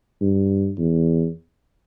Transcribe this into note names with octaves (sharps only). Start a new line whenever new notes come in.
G2
E2